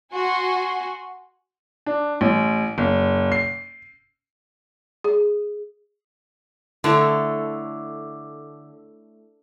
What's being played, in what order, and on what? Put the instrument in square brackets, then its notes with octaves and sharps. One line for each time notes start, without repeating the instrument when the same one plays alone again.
[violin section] F#4 G#5 C6
[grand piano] D4
A1
F#1
C7
[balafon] G#4
[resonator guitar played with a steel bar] D3 [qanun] A3 E4 C#5